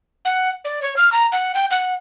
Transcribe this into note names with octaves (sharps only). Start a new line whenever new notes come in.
F#5
D5
C#5
F6
A#5
F#5
G5
F#5